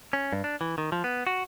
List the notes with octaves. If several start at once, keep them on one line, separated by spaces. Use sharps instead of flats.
C#4
G2
D4
E3
D#3
F3
B3
F#4